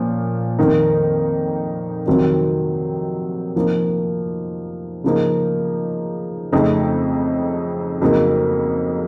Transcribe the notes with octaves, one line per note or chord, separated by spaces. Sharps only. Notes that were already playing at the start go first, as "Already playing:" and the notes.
Already playing: A#2 F3 C#4
F2 D#3 A#3 D#4
F2 C3 D#3 F#3 C4
C3 F3 A#3 D#4
C#3 F3 A#3 D#4
F2 C#3 A3 C4 D#4
F2 C#3 F#3 A#3 D#4